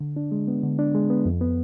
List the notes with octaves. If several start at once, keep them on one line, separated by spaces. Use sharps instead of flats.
D3
D4
G#3
B3
D3
D4
G#3
B3
F2
B3